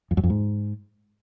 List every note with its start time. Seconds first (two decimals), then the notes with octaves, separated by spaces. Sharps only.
0.11 F2
0.17 F#2
0.23 F2
0.30 G#2